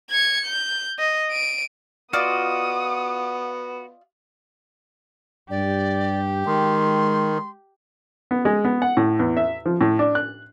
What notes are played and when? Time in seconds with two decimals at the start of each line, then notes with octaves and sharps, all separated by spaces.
0.10 G#6 C#7
0.46 G6
0.99 D#5
1.31 D7 D#7
2.13 B3 F4 F#4 D5 D#5 D#6
5.50 G2 G4 D5
6.46 D#3 G#3 C6
8.31 B3
8.45 G#3
8.65 B3
8.82 F#5
8.97 A2
9.19 E2
9.37 E5
9.66 F3
9.81 A2
9.99 D4
10.15 F#6